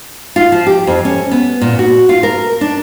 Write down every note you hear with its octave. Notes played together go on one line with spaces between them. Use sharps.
F4
F3
G4
F2
C#4
B3
A#2
F#4
F4
A#4
D4